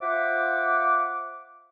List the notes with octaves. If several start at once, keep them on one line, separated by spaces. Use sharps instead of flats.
F4 C5 E5 F#5 D6